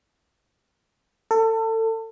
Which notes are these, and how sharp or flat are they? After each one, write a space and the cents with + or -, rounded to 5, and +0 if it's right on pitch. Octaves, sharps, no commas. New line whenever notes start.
A4 +30